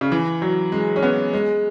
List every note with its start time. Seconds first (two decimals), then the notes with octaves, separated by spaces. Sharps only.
0.01 C#3
0.12 E3
0.42 F#3
0.72 G#3
0.96 C#4
1.03 B3
1.33 G#3